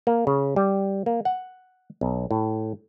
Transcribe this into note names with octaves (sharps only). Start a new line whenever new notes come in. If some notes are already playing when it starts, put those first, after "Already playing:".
A#3
C#3
G3
A#3
F#5
B1
A2